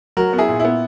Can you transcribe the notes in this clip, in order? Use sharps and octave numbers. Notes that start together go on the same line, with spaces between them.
F#3 F#4 A#4
B3
E4 G#4
A#2
E4
B3